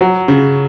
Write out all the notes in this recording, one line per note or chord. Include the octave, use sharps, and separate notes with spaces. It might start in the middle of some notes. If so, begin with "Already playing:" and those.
F#3
C#3